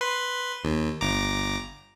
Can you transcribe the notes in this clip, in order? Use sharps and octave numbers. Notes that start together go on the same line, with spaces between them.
B4 C6
D#2
G1 A#5 D6